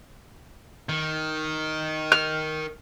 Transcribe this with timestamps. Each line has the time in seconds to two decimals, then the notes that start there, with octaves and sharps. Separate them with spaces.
0.89 D#3
2.12 F6